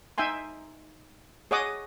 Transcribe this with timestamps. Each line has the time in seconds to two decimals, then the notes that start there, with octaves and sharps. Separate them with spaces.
0.18 D#4 E5 G5 G#5 C6
1.51 G#4 C#5 D#5 F#5 D6 D#6